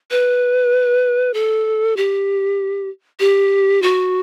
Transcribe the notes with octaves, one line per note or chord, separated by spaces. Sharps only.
B4
A4
G4
G4
F#4